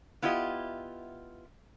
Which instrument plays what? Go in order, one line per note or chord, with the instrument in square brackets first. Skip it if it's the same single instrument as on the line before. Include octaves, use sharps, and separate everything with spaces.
[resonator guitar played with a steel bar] B3 E4 F4 G4 D#5